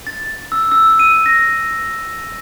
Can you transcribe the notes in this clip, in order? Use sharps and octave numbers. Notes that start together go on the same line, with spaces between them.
A6
E6
E6
D#7
A#6